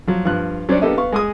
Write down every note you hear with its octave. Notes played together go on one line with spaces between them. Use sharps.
F3 F#3
G2 F3 F#6
F#3 C#4 D4 F#4 C5 D5
A#3 B3 D4 G4 A4 D#5
B3 F5 C#6
G#3 G#4 D#6